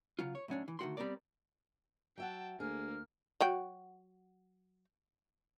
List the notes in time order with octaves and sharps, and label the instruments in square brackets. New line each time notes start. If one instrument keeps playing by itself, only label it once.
[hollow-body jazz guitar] C#3 F#3 F4
C#5
A2 F#3 C#4 D4
E3
D2 D#3 A3 F#4 G5 C6
G3 B3 C4 A#4 D5
[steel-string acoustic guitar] F#3 E5 F#5 [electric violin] G5 A5
[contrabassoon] D2 [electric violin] A#3 [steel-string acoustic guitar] G#4 [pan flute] F6
[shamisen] F#3 F#4 G5